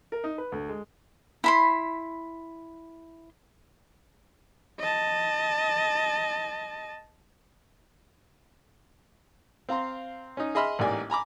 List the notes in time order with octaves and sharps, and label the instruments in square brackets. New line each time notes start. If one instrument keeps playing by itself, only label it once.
[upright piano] A#4
D#4
B4
D2
G#3
[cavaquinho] E4 B5 C6
[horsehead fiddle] D#5 A5
[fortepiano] C4 F5 A#5 C6
C#4 D#4
G#4 D#5 E5 B5 C6 F6
A1 G#2 A#3 G4 D5 G#5
G#5 A#5 B5 D6